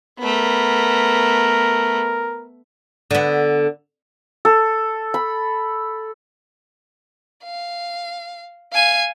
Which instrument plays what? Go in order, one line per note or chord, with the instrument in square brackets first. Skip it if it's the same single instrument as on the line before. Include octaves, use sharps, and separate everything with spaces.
[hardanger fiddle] A3 B3 [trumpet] A#4
[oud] D3 B3
[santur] A4
B5
[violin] F5
F5 G#5